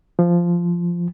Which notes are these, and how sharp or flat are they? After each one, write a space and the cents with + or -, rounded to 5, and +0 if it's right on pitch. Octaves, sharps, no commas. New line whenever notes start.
F3 -10